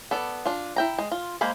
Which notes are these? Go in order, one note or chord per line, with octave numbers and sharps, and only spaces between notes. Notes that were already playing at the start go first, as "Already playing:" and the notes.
B3 A4 D5
D4 F4
E4 G5 A#5
G#3
F4
G#3 A#3 C5 F5 B5